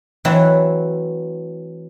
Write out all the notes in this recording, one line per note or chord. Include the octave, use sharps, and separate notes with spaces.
E3 F#3 A3 C4 E4